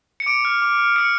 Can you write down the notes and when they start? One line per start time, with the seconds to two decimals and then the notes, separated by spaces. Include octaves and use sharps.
0.20 C#7
0.26 D6 D7
0.45 F6
0.62 D6
0.79 F6
0.96 D#6 C#7